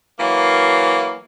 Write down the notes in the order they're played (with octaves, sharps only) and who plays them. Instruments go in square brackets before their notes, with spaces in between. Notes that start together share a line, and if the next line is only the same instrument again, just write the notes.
[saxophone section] E3 F#3 A#3